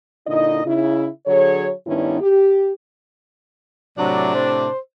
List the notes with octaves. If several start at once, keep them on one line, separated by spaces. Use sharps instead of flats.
A#2 D3 D#4 E4 D#5
C#3 D#4 E4
D3 F#3 G#4 C#5
G2 D#3 B3 C#4 D4 E4
G4
A2 C3 F#3 D4
C5